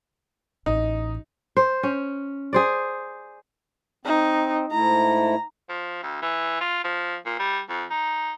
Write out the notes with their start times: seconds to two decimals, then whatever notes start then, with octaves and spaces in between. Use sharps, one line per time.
0.66 A1 D#4
1.57 C5
1.83 C#4
2.53 G#4 C5 D5
4.05 C4 D#4
4.72 G#2 A3 E4 A#5
5.69 F3
6.03 D2
6.22 E3
6.61 F4
6.84 F3
7.26 A#2
7.39 G3
7.69 F2
7.90 D#4